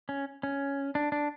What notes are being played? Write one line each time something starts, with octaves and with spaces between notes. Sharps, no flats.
C#4
C#4
D4
D4